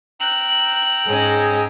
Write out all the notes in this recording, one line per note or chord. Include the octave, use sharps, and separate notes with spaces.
G5 A#5 E6 F#6
G#2 C#4 G#4 A#6